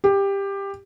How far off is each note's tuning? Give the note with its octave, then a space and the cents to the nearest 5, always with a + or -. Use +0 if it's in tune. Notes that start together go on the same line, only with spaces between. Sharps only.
G4 +15